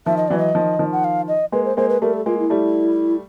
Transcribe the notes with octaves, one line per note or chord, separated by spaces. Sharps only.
D#3 F3 E5
D#5
E3 F#3 D5
D#5
D#3 F3
D#3 F3
F#5
F5
D#5
G#3 A#3 B4
C5
G#3 A#3 C5
B4
G3 A3 A#4
A4
G#3 A#3 F4
E4
G3 A3